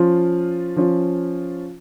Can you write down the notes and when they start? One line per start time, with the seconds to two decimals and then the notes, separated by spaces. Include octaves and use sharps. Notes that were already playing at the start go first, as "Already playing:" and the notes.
Already playing: F3 C#4 F4
0.76 F3 C#4 F4